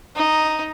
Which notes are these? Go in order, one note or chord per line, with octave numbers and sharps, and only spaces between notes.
D#4